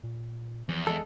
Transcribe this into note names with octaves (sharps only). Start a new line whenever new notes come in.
A#2
E2 F3
G#3 A4